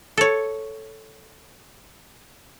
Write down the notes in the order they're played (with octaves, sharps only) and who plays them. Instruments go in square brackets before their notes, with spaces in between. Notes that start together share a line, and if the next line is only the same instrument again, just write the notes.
[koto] A4 C#5